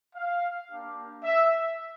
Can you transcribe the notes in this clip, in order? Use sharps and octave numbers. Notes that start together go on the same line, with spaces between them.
F5
A#3 D4 G4
E5